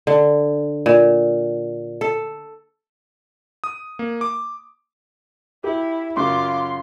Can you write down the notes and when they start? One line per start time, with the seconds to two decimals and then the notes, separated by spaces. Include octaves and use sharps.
0.07 D3
0.86 A#2
2.01 A4
3.64 D#6
3.99 A#3
4.21 D6
5.64 E4 G4
6.17 F#2 C#3 F#3 F4 C6 D6